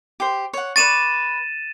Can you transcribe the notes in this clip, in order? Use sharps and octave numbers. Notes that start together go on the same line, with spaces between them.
G4 C5
C#5 F#5
B4 D5 C#6 A6 D#7 E7